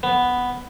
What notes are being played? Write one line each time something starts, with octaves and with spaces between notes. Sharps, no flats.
B3